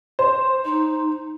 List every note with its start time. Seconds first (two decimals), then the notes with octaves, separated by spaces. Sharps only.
0.19 C5
0.65 D#4